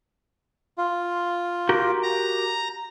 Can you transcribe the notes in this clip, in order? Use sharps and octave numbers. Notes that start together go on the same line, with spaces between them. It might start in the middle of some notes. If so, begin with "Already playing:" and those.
F4
F#4 G4 A#4
A#5